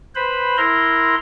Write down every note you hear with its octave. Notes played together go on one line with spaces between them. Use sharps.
B4 C5 B5
E4 A#4 A#5 C6